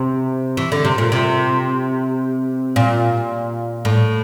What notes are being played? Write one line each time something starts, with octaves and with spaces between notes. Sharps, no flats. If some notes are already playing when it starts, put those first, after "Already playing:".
Already playing: C3
E3
D3
C3
A#2
C3
A#2
A2